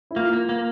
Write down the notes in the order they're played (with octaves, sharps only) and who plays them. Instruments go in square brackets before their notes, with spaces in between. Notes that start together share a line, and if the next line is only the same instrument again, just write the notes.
[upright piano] E4
[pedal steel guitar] A#3 [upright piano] F4
[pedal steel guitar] A#3
A#3